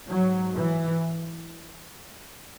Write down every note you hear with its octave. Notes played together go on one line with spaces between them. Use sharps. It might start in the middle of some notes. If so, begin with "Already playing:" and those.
G#2 F#3
E3